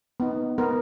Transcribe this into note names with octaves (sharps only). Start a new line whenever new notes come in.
B3 D#4
B3 A#4